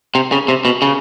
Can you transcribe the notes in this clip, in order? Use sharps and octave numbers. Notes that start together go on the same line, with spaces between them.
C3
C#3
C3
B2
C#3